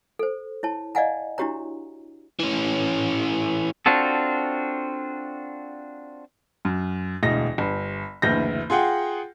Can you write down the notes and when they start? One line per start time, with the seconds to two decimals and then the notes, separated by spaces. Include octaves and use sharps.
0.19 A4 C5
0.63 E4 C#5 A5
0.95 D5 D#5 F5 F#5 G#5 A#5
1.38 D4 E4 F#4 G4 C#5 A#5
2.40 E3 C#4
3.86 C4 D4 F4 F#4 A4
6.65 F#2
7.23 E1 D2 D#5 A#6
7.58 G1
8.22 F#1 D2 E3 G6 A#6
8.70 F4 G#4 F#5 G5